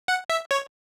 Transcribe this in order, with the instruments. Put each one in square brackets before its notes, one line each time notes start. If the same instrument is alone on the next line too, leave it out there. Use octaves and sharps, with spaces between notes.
[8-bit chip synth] F#5
E5
C#5